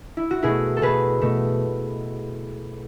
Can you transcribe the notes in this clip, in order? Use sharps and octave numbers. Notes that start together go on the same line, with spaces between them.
E4
F#4
B2 A3 E4 G#4
A4
B2 A3 G#4 B4
B2 A3